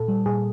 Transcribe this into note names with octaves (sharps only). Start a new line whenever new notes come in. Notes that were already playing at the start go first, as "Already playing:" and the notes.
Already playing: A#2 A4
G3
A#2 G#4